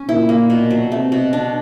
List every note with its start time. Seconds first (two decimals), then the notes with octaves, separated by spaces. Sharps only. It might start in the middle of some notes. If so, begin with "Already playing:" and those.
Already playing: C#4
0.09 A#2 E4
0.29 A#3
0.50 B2
0.71 F#3
0.92 C3 A3
1.12 B2
1.33 D4